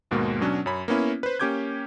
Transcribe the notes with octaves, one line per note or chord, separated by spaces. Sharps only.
D#2 G#2 B2 G#3 A#3
B2 F#3 C#4 D4
F#2 C#5 B5
A#3 B3 C#4 E4
B4 C5
A#3 C#4 G4 D6 G6 G#6